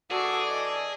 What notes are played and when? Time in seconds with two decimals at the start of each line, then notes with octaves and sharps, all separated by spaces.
0.11 E3 D4 F#4 G#4 A4 D5 E6
0.50 D#5